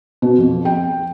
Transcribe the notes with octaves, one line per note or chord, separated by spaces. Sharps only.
B2
F2
G5